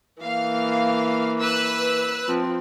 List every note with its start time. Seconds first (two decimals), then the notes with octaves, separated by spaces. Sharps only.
0.22 E3 A#3 F5
1.40 B4 E6 F#6
2.28 F3 C4